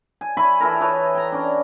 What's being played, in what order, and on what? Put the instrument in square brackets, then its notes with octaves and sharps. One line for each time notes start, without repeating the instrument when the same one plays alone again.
[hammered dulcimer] G#5
E4 G#5 B5 C#6
E3 E4 A4 A#4
G#4 A4 B4 C#5
G5 A#5
C#4 D4